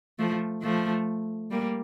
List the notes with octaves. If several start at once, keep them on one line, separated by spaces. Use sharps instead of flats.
F3 A3
F3 A3
G3 A#3